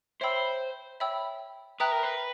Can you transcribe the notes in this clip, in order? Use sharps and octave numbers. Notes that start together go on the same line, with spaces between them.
C5 C#5 E5 G5 B5 E6
C#5 E5 G5 B5 E6
B4 E5 G5 A#5 D#6 F#6
A#4
B4